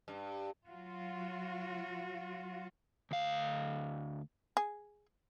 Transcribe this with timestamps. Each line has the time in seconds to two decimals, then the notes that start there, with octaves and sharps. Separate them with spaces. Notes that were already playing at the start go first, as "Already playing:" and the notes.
0.08 G2
0.68 F#3 F4 F#4
3.11 D2 F5
4.57 G#4